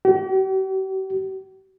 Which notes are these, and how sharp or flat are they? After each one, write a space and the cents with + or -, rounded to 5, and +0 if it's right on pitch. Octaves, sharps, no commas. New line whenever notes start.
G4 -45